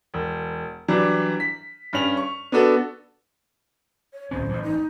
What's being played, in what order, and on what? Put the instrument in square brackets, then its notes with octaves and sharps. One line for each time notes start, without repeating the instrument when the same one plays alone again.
[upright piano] E1
E3 F#3 G3 D4
B6
G2 C#4 F7
C#6
B3 D4 F#4 A4
[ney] C#5
[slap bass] D1 C2 C#4 [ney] C5
[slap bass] A1 G2
[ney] D#4